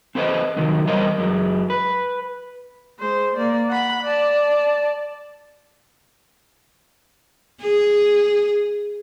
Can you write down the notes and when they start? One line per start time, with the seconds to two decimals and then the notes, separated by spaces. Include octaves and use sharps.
0.15 C4 A4 B4 C5 D#5
0.56 C3 D#3 F3 F#3
0.87 E2 G3 A#4 C5 C#5 D#5
1.18 F#2 F#3 G#3
1.70 B4
2.99 G#3 C5
3.36 A#3 D5
3.69 F#5 B5
4.03 D5 A5
7.61 G#4